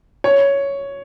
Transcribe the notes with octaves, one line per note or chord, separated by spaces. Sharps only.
C#5